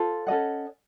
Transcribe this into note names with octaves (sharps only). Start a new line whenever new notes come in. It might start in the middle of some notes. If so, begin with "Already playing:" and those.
Already playing: F4 A4 C5
C#4 A4 D#5 F#5